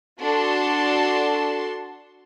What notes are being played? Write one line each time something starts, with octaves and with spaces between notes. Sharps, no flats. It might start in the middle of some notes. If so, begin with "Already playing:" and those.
D4 F#4 A4 A5 C6